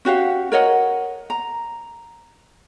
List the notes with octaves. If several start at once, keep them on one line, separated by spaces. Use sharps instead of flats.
C#4 F#4 G4 F5
A#4 C#5 D#5 F#5
A#5